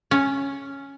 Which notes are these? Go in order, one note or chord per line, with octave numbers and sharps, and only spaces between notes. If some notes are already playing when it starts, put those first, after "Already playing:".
C#4